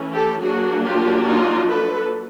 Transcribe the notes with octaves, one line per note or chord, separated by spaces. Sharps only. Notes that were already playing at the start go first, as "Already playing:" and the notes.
Already playing: E3 A3 C#4
G4 A4
F#3 A#3 D4 F#4 G#4
F4 G4
D#4 F4
A4 B4